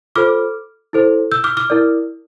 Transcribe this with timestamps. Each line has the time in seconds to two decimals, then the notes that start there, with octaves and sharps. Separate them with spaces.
0.16 F4 A4 C5 D6 F6
0.93 E4 A4 C5
1.32 E6 G6
1.44 D6 F6
1.57 D6 F6
1.70 E4 A#4 D5